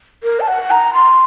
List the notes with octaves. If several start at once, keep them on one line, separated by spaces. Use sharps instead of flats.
A#4
A5
F#5
A#5
C6